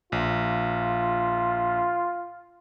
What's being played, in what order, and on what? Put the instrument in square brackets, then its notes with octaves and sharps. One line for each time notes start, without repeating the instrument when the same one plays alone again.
[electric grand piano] A#1 [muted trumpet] F4